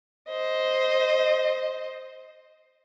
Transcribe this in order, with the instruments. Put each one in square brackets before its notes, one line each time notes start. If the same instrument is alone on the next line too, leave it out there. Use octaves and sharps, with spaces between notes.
[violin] C5 D#5